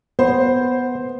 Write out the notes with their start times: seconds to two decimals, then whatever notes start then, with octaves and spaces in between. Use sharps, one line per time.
0.19 B3 C5